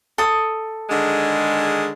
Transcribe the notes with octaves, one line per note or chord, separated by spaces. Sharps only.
A4 D#6
D3 D#3 G#3